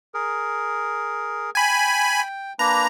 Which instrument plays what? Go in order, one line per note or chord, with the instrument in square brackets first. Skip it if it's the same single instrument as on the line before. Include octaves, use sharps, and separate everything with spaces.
[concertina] G#4 A#4
[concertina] G5 [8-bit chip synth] G#5 B5
[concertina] A#3 D4 B4 [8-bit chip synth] A#5